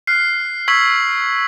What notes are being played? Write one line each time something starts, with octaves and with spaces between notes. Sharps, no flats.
F6 F#6 C7
C#6 E6 G#6 B6 F#7